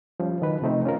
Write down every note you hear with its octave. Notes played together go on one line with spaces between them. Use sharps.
F3 G3 C#4
D#3 F#3 B4
C3 F3 A3 C4 D#4
C#4 F4 A#4